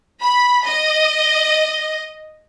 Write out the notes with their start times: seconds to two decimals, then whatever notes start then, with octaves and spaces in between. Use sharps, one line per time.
0.21 B5
0.65 D#5